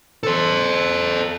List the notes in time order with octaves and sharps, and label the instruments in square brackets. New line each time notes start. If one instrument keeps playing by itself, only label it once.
[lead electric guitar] A4 C5